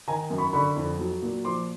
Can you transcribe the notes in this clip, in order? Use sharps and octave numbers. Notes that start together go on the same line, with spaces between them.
D#3 G#5 A#5
F#2
B5 C#6
D3 B5 C#6
F2
F#3
A#2
F3 C6 D6